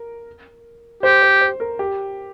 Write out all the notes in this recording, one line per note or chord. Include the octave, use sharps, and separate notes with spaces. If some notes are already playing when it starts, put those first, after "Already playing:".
Already playing: A#4
G4 C5
C5
C5
A#4
G4